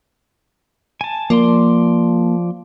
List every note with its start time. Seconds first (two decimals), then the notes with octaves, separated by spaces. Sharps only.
1.01 G#5 A5
1.30 F3 A#3 D5 C6